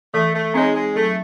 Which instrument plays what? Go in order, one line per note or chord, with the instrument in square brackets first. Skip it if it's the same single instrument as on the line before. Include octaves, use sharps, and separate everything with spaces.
[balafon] E3 [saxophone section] A3
[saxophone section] A3
[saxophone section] G#3 [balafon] C4 D#4 G#4 C#5
[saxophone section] G#3
[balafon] F#3 [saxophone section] A3